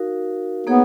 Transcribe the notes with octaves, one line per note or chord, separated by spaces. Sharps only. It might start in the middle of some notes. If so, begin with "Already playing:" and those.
Already playing: D#4 F#4 A#4 F5
A#3 B3 D#4 G#4 C#5